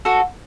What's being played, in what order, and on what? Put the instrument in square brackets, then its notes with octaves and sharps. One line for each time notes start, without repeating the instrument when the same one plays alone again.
[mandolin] F#4 A4